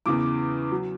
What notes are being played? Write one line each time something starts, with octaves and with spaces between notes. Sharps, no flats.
E2 C#3 E3 D6
F#3